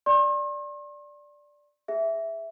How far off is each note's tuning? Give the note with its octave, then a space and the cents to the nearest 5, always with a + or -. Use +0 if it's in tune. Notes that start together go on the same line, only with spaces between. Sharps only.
D5 +0 C6 +45
G#4 +0 E5 +0